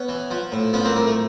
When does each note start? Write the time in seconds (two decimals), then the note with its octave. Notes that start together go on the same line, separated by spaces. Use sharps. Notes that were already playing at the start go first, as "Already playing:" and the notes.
Already playing: B3 C#4
0.09 E3
0.31 F3
0.52 A2
0.73 F3 B3 C#4
0.85 A#3 C4
0.96 A2 A#3
1.07 A3